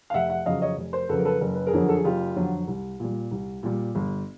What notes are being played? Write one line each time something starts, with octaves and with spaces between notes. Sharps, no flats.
F5
F1 E5 F#5
E5 F#5
F2 C#3 F#3 D#5 F5
C#5 D#5
F1
A#4 C5
F2 C#3 F#3 A4 B4
A#4
A4 B4
F#1 A#4
B4
G#4 A#4
F2 D3 F#3
A4
G#4
F#1 F4 G4
F2 D3 F#3
C2
A#2 G3
C2
A#2 G3
G1